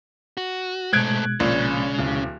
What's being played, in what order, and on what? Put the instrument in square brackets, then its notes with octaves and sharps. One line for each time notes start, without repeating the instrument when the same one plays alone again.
[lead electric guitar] F#4
[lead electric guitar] G#2 A3 [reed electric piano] B2 G#3 [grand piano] F#6 G#6 D7
[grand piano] A#1 [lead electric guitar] C#3
[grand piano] D1